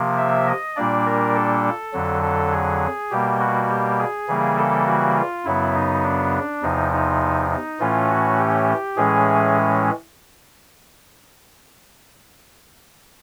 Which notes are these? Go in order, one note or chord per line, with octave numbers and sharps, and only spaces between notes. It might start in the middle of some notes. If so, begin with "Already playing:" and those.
Already playing: C3 F3 A#3
E5
D#5
A#2 G3 A#3 D4 D5
A#4
A4
F2 D3 F#3
A4
G#4
B2 G3 A#3 G4
F#4
G4
G#4
C#3 E3 G3 A#3
A4
F#4
F4
F#2 C#3 F#3 B3 E4
D#4
D4
E2 C3 F3 D#4
D#4
D#4
A2 E3 A3 C#4 F4
F#4
G4
A2 E3 G#3 C#4 G#4